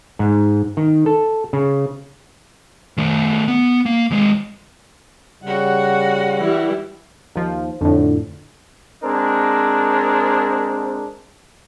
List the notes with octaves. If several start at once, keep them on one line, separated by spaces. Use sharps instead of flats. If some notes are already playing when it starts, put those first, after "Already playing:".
G#2
D#3
A4
C#3
D#3 A3
B3
A#3
D#2 G#3
C#3 G3 F#4 F#5
E3 G3 E4
D#2 F3
F2 A2 D3
G#3 C4 D4 A#4